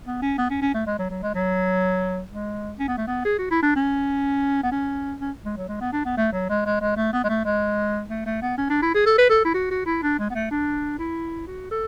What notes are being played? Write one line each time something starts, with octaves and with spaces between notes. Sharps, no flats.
B3
C#4
B3
C#4
C#4
A3
G#3
F#3
F#3
G#3
F#3
G#3
C#4
B3
A3
B3
G#4
F#4
E4
D4
C#4
B3
C#4
C#4
G#3
F#3
G#3
B3
D4
B3
A3
F#3
G#3
G#3
G#3
A3
B3
G#3
A3
G#3
A3
A3
B3
C#4
D4
E4
G#4
A4
B4
A4
E4
F#4
F#4
E4
D4
G#3
B3
A3
D4
E4
F#4
A4